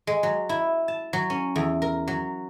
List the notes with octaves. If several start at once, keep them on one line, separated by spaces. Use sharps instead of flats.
G#3
F#3
E4
A5
F#3
C#4
E2
A#4
F#3